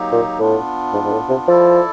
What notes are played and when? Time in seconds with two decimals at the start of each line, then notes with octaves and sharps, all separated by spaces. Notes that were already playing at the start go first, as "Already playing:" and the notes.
Already playing: F#3 A#3 D#4 G4
0.12 A#2
0.39 A2 B3 D4 F4
0.94 G#2
1.04 G#2
1.12 A2
1.29 C3
1.48 F3 E4 A4 D5